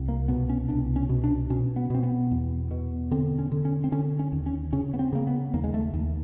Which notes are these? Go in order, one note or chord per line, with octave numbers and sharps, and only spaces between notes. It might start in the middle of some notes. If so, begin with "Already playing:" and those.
Already playing: C2
A#3
B2 B3
C#4
C2 D4
C#4
B2
D4
B2 C#4
B3
B2 C4
B3
E2
B2
D3 C4
C#4
D3
C#4
C4
D3 C#4
C#4
D#2
C#4
C#3 C#4
B3
C4
C#3 A#3
B3
D#2 A#3
G#3
A3
D#2